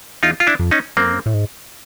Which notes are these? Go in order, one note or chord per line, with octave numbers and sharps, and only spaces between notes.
E2 D#4 F4
F4
D4 E4
F2
C#4 D#4
F#2 A#3 C4
F2
F#2
A2
G#2